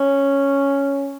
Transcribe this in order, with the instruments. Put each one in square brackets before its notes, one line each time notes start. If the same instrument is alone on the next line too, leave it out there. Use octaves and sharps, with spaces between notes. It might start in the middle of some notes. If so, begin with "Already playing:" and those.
Already playing: [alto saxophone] C#4